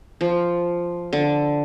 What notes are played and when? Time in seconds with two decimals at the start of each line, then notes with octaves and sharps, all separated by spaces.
0.21 F3
1.13 D3